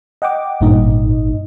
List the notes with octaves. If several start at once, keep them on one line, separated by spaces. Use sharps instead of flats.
D#5 F#5 G5 D6
G#1 G2 A#2 D#4 D#5